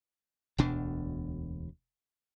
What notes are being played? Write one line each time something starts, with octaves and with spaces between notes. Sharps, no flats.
E1 D2 B2 D4